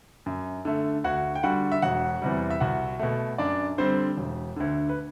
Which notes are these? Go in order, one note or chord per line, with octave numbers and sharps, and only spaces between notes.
F#2
D3 A3
D2 F#4 F#5
G5
D3 G3 F#4 F#5
E5
E1 F#4 F#5
E2 C3 G3
E5
C2 F#4 F#5
B2 A3
F#2 D4 D5
D3 G3 C4 C5
E1
D2 D3
B4